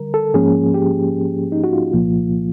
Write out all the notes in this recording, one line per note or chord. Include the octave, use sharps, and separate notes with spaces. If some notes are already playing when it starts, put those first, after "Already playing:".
Already playing: D3 G3 A#4
A4
G#2 F3 A#3 C#4 G#4
G4
D#4
F#4
F4
C2 A#2 F3 A#3